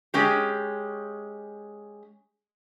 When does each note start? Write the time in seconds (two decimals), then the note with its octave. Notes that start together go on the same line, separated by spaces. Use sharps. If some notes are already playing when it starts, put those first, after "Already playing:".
0.14 G#3 C#4 G4